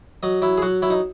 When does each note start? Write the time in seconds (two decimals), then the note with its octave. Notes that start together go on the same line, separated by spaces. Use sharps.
0.23 F#3 D#5
0.42 F#3 E4
0.58 G#4
0.62 F#3 F#4
0.82 F#3 E4
0.90 D#4